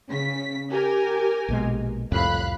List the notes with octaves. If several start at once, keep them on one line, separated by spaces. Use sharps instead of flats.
C#3 B6
G4 A#4 G#5
A#1 B2 G#3
C2 F2 A2 F5 B5 F#6